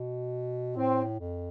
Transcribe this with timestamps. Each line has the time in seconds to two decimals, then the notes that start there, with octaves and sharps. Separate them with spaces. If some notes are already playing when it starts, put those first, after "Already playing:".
Already playing: B2
0.76 A2 C4
1.20 F2